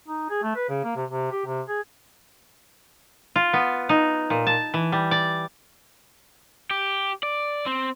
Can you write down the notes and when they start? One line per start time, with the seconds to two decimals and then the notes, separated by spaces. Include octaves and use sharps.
0.08 D#4
0.30 G#4
0.43 A3
0.56 B4
0.69 C#3
0.84 A#3
0.96 C3
1.10 C3
1.31 G4
1.46 C3
1.68 G#4
3.36 F4
3.53 B3
3.89 D#4
4.30 A#2
4.47 A5
4.74 E3
4.92 G3
5.11 D5
6.71 G4
7.23 D5
7.66 C4